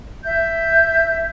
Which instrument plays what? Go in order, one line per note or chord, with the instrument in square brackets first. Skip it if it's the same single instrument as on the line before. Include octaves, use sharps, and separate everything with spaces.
[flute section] E5 G6